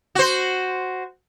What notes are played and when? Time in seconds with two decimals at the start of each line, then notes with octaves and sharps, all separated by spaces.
0.15 F#4 C5